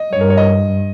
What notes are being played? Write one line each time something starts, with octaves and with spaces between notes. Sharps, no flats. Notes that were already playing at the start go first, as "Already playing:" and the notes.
Already playing: D#5
G2 C#5
A#4
C#5
D#5